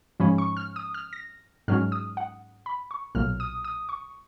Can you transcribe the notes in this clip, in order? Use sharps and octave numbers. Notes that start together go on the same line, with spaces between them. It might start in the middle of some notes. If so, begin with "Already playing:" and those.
G#2 F3 G#3 C#4 B5
C#6
F6
D#6
F6
A#6
G#2 F#3 C#4 F6
D#6
F#5
B5
C#6
B1 A#2 F#3 F6
D#6
D#6
C#6